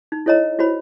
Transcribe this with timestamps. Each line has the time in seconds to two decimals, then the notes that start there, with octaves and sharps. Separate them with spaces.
0.12 D#4
0.26 E4 A4 C#5 D#5 A#5
0.59 E4 F#4 C5 C#5 B5